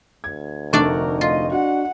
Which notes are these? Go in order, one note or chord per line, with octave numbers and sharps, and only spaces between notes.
D2 G#6
F1 A3 D4 D#4 A#4 D5 C#6
F4 D#5
D4 F#4 F#5